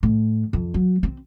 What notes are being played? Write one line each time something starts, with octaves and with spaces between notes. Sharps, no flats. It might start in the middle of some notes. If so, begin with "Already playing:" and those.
A2
F2
F#3
C4